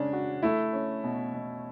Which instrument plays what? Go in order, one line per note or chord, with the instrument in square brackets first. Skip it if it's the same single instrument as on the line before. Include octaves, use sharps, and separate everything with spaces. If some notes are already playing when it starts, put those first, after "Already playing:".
Already playing: [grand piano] C#3 G#3 C#4 [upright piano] D4
[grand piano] F#4
[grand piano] A3 [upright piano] E4
[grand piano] C#4
B2
B2